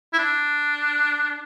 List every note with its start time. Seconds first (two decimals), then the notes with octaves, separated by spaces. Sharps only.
0.13 E4
0.19 D4